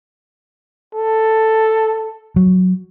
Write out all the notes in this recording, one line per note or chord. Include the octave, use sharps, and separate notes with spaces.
A4
F#3